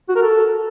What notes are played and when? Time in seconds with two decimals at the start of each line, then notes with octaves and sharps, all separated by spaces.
0.09 F#4
0.16 A#4
0.22 A4